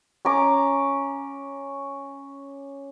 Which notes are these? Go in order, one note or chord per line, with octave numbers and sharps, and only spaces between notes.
C#4 A#5 D6